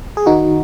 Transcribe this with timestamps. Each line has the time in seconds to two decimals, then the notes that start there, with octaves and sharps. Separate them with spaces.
0.17 G#4
0.26 D#3 D#4 F#4